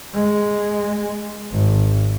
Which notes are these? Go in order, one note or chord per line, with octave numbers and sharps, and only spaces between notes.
G#3
G#1